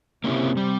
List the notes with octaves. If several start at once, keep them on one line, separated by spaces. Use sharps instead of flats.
C3 A#3 C#4 E4
G3